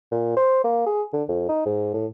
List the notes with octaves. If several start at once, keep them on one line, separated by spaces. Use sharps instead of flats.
A#2
C5
A#3
G#4
D3
F2
D#4
G#2
A2